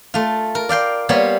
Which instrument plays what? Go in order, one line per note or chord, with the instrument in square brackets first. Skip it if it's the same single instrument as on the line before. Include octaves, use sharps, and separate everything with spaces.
[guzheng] A3 F4
A#4
D5 F5 G5 C6
G3 A#3 B3 C5 C#5